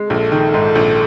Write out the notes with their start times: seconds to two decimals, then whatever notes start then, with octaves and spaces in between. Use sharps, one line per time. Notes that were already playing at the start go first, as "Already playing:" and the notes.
Already playing: G#3
0.10 A#1 A4
0.32 D#3
0.54 G#2
0.75 A#1